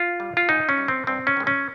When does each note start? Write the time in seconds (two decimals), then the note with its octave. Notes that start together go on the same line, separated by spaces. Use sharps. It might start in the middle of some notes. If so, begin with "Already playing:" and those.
Already playing: F4
0.20 G3
0.37 F4
0.49 G#2 D#4
0.69 C#4
0.78 G3
0.88 C4
1.07 G2 C4
1.27 C#4
1.37 D#3 G#3
1.47 C#4